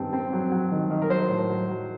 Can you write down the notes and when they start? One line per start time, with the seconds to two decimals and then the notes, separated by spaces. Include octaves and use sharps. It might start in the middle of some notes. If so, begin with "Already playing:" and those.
Already playing: G2 D#3 C4
0.13 C4
0.33 F#3
0.52 F#3
0.71 D#3
0.90 D#3
1.02 A#4
1.10 F#3 C5
1.29 A2
1.49 F#3
1.69 F#3